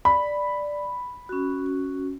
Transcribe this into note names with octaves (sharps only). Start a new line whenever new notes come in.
D5 B5
C#4 F#4